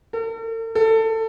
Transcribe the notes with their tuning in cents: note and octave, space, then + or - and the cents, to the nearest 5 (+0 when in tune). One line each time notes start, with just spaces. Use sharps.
A4 +45
A4 +20